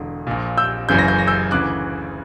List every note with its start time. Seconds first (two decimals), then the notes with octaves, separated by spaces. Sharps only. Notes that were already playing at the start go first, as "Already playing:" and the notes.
Already playing: E1 E2 D3
0.27 A#1 A#2
0.58 E6 G6
0.89 F#1 F#2 C#3 E3 G6
0.98 A#6
1.08 G6
1.19 A#6
1.27 E6 G6
1.51 D2 C#3 E3 D6 F#6